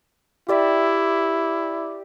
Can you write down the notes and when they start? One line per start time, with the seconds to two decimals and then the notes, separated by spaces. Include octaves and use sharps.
0.48 E4 G4 D5 E5